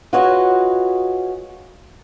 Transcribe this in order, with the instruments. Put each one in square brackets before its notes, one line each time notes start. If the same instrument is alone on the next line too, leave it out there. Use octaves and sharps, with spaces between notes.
[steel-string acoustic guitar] F4 F#4 G#4 B4 C#5 D#5